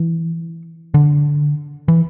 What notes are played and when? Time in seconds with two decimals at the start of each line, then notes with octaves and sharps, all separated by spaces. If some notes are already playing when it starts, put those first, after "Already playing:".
Already playing: E3
0.94 D3
1.88 E3